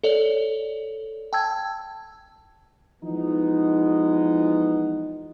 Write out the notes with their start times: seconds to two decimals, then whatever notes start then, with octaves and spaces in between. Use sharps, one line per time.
0.03 A4 C#5 D5
1.33 G5 A5 E6 G#6
3.03 E3 F3 G#3 B3 D#4